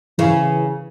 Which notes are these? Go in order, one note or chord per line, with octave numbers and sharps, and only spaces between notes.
C#3 E3